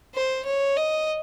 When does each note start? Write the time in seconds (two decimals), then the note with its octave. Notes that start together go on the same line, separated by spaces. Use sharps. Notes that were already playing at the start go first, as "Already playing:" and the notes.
0.15 C5
0.46 C#5
0.77 D#5